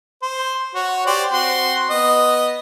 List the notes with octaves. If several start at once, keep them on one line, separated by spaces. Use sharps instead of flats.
C5
F#4 C#5
G4 C5 D5
C4 F#4 C6
B3 D#5